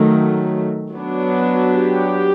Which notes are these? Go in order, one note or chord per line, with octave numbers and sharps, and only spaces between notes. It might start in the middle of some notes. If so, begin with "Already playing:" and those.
Already playing: D#3 F#3 A3
F#3 B3 D4
G4